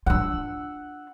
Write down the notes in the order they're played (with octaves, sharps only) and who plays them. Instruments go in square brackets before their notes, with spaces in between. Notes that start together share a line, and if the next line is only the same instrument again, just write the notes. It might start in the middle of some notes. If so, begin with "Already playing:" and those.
[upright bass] D4 F4 [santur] F#5 E6